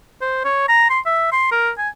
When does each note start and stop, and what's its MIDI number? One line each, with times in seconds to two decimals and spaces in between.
0.21 0.44 72
0.45 0.65 73
0.68 0.88 82
0.90 1.00 84
1.06 1.29 76
1.32 1.50 84
1.51 1.70 70
1.78 1.89 80